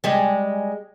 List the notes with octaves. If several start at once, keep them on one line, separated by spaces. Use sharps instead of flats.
G3 G#3